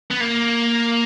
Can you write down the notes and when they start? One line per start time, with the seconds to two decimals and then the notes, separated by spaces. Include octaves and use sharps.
0.11 B3
0.21 A#3